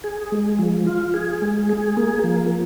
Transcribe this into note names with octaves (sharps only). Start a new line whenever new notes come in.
G#4
G#3
F3
F4
G#4
G#3
G#4
A#3
F3